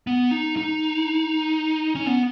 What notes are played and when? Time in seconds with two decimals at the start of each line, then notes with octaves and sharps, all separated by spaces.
0.07 B3
0.31 D#4
0.57 D#4
1.95 C#4
2.06 B3